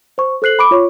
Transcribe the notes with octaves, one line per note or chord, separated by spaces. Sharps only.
C5 C#6
A4 C5 F#6 C7 F#7
B5 D6 D7
F4 C#5 C#6